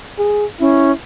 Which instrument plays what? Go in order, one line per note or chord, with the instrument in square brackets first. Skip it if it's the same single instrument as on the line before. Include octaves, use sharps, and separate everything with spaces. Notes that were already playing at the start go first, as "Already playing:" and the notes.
[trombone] G#4
[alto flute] C#4 [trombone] E4